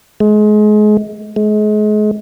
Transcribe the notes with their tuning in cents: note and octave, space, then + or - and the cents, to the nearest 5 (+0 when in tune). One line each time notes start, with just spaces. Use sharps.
G#3 +30
G#3 +35